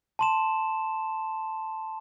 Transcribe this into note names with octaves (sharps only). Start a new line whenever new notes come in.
A5 C6 E7